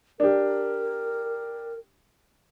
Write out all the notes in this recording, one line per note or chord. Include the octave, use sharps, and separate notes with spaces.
D4 G4 A#4